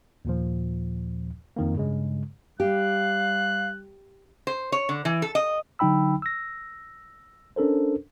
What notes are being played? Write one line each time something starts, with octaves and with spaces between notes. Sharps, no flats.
D#2 A#2 F3
F2 D#3 A#3
G2 C#3 G#3
G3 G4 F5 F#6
C5
C#5
D3
E3
A4
D#5
D3 F#3 D#4 G5 B5 E6
E6 A#6
C#4 D4 A4 A#4 C5